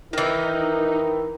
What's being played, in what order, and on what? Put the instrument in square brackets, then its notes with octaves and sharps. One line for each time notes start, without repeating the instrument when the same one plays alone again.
[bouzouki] D#3 E3 [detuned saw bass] D#4 [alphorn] E4 [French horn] A#4